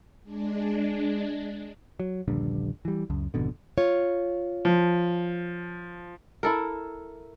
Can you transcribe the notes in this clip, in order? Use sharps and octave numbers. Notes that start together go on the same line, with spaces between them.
G#3 D4
F#3
D#1 A#1 G2 D3
E3 G3
C#2 F#2
G#1 F2 B2 D3
F4 C#5
F3
E4 A4 A#4